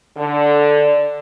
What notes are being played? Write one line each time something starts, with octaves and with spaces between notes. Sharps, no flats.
D3